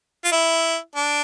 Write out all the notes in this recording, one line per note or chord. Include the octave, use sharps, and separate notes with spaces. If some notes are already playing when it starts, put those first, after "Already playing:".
F4
E4
D4